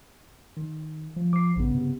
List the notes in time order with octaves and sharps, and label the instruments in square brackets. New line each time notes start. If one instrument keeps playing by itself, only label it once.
[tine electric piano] D#3
[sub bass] F3
[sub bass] F3 [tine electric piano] D6 C7
[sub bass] A1 [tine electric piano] G2 C#3 B3
[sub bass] C3